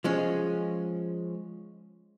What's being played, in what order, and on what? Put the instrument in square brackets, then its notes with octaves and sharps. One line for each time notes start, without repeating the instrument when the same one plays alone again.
[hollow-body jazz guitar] F3 G#3 C#4